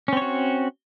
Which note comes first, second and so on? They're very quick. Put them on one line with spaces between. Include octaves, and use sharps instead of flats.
C#4 C4 C#5 F#4